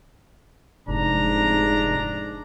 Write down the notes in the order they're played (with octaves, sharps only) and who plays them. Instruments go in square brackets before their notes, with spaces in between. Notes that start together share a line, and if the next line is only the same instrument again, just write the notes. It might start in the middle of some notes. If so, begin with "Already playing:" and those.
[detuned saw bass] F1 [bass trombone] G#2 [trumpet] D4 [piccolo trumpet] A#5